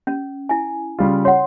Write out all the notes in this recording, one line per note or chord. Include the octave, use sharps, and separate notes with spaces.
C#4
E4 G#5
C#3 G3 F4
C#5 F#5 C6